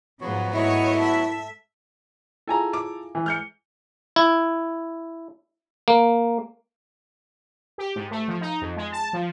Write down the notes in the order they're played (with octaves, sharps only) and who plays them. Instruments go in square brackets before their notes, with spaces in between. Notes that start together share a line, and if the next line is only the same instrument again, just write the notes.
[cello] G#2 F3 [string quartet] C#3 [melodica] F#3 B3 F#4
[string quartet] G#2 A3 D#5 [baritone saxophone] E4 [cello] C#5
[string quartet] A4 [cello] E5
[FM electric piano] E4 F4 G#4 [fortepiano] A4 G#5 A#5
[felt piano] D6
[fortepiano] E3
[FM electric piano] G#3 [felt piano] F6 G6 C#7
[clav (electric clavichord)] E4
A#3
[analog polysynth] G4
G#2
A3
F3
D#4
F2
G#3
A5
F3